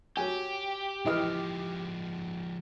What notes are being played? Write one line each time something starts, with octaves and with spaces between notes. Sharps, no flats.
F#3 G4 G#5
E3 F3 G#3 D#5 F6